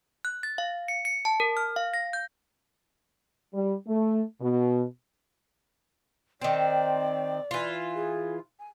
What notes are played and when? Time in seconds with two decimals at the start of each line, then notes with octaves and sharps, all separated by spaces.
0.25 F#6
0.43 A6
0.58 F5
0.88 C#7
1.05 C#7
1.25 A5
1.40 A#4
1.57 F6
1.76 F5
1.94 A#6
2.13 G6
3.54 G3
3.88 A3
4.41 B2
6.41 D#3 C4 D5
7.51 E3 F4
7.94 G#4
8.59 G#5